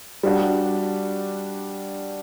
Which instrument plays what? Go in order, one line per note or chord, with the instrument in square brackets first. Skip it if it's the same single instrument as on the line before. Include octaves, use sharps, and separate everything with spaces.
[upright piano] G3 D4 F#4